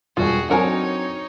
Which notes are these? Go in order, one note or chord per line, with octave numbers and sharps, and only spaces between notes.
E1 G2 F4 F#4 G#4 G5
F#3 C4 D4 D#4 A4 A#4 C#5 G#5